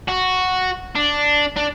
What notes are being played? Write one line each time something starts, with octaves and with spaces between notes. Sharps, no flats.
F#4
D4
D4